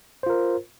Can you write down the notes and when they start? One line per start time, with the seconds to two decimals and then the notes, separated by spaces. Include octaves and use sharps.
0.23 C5
0.26 F4
0.30 A#4